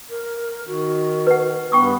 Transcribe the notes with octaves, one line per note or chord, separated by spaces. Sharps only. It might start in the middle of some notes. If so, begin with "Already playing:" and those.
A#4
D#3 F#4
B4 F#5
G2 B3 G5 C#6 D#6